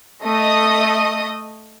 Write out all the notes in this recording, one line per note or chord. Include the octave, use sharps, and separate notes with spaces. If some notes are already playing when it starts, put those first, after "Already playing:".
A3 D#5 D#6